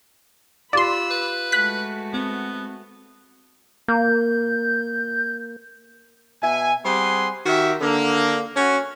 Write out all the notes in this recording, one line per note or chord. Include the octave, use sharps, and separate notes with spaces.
F4 G4 D5 B5 C6 E6 F#6
B4
G#3 A3 F#4 F#6 B6
B3 C4
A#3 G6
B2 E5 G#5
G3 C4 G#4 F#5 C6
D#3 F#4 G4 A#4 E5
D3 A#3
C#4 F#4